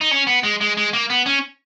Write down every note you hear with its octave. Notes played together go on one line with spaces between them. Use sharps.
D#4
C#4
B3
G#3
G#3
G#3
A#3
B3
C#4